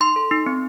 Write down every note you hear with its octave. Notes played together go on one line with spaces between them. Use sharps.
D#4 C6
A4
D#4
C4